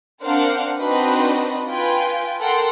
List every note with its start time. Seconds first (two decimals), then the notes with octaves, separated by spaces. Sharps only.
0.22 C4 D4 A#4 C5 F5 F#5
0.79 C4 D4 D#4 F#4 B4 D#5
1.67 F4 B4 G5 G#5
2.39 A4 A#4 F#5 G5 C6